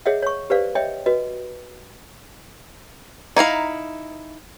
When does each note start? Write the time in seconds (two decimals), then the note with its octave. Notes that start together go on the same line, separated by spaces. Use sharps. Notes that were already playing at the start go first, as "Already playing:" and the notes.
0.06 G#4 C#5 D#5 E5 F#5
0.22 C#5 C#6
0.50 G4 B4 C5 D5 F5
0.75 C#5 D#5 E5 G5
1.06 F#4 B4 D#5
3.36 D#4 E4 F5 A#5